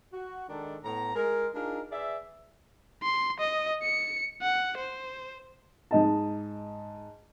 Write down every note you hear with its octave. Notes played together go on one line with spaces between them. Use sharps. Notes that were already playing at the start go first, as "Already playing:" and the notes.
F#4
D#3 G#3 D4 D#4 A4
A2 B3 A#5
G#3 A#4
D4 D#4 F4 G#4 A#4
G#4 B4 D5 E5
C6
D#5
C#7
F#5
C5
G#2 D#5 A5